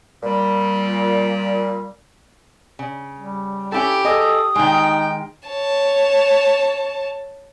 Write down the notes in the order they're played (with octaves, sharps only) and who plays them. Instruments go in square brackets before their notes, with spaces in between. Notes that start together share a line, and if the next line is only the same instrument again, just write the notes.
[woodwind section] A#2 G3
[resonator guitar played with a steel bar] C#3
[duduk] G3
[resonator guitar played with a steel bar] C#4 E4 A4 [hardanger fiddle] G4
[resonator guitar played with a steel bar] G#4 D#5 [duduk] A4 [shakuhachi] D#6
[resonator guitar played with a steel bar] D#3 G#3 [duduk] D#4 [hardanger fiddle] G5
[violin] C#5 A5